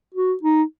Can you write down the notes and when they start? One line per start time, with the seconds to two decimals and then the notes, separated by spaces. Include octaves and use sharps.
0.14 F#4
0.43 D#4